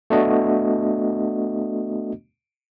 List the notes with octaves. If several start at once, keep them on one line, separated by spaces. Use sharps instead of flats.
A3 B3 D4 F#4 D#5